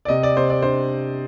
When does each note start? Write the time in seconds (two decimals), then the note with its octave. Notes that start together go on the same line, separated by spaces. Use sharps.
0.05 D5
0.09 C3 D#5
0.23 D5
0.37 C3 C5
0.50 D5
0.62 D4 C5